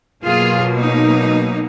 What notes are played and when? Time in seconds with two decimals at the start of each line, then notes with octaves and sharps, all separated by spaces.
0.24 B2 F#3 A#3 F4 G#4
0.78 D#4